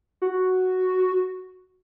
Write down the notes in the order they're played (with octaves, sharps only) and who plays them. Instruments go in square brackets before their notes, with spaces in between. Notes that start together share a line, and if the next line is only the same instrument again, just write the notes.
[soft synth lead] F#4